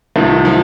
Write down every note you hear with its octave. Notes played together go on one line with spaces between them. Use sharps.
C2 C3 D#3 F3 A3
F3